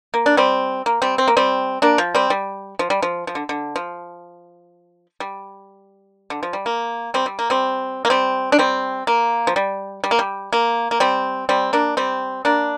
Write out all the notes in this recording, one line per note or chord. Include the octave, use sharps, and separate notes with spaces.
A#3
D4
G3 C4
A#3
G3 C4
C4
A#3
G3 C4
A#3 D4
F3
G3 C4
G3
F3
G3
F3
F3
D3
D3
F3
G3
D3
F3
G3
A#3
G3 C4
G3
A#3
G3 C4
A#3
G3 C4
D4
G3 C4
A#3
F3
G3
G3
A#3
G3
A#3
A#3
G3 C4
G3 C4
A#3 D4
G3 C4
A#3 D4